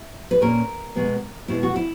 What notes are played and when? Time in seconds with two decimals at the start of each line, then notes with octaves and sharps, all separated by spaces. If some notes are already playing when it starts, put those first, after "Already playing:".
Already playing: E5
0.31 B4
0.41 A#2 A#3 C#4 A#4
0.95 B2 G#3 B3
1.48 B2 G#3 B3 E4
1.63 F#4
1.76 E4